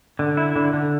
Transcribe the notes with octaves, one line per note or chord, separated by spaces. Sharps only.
D3
E4
D3
D3